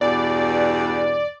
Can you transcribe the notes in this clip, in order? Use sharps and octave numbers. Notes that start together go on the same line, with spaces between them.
E2 G2 B2 D5